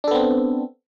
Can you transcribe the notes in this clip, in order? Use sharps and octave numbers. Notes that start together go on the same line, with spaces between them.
B3 C4 D4 A4